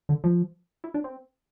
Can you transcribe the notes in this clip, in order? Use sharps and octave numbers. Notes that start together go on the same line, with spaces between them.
D3
F3
E4
D4
C4